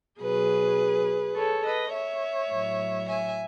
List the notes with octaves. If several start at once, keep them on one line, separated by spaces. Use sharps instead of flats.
B2 F#3 G#4 B4
A4 C#5
B4 D#5
C#5 E5
A2 F#3
E5 G#5